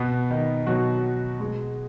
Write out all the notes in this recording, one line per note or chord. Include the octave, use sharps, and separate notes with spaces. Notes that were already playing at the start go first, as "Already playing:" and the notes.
Already playing: B2 B3
D#3 D#4
B2 F#3 F#4
B2 G#3 G#4